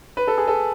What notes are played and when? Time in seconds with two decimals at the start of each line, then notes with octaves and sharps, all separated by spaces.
0.17 B4
0.27 A4
0.37 G#4
0.48 A4